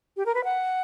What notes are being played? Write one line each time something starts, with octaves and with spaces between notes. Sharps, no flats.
G4
A#4
B4
F#5